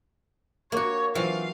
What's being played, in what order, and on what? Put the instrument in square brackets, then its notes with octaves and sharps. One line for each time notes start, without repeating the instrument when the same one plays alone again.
[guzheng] A#3 F#4 [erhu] C#5
[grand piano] E3 C4 F4 [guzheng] F#3 [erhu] F5